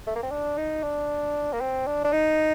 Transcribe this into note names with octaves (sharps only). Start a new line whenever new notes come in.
A3
A#3
C4
D4
D#4
D4
A#3
C4
D4
D4
D#4